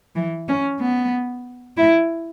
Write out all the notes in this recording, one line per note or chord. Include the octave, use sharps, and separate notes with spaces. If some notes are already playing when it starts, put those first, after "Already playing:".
E3
C#4
B3
E4